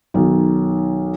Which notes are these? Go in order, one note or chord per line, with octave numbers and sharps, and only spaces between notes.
B1 D#3